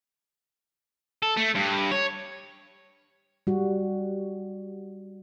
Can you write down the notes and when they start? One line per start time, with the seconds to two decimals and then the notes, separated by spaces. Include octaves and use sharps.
1.23 A4
1.37 A3
1.55 G2
1.92 C#5
3.47 G3 F#4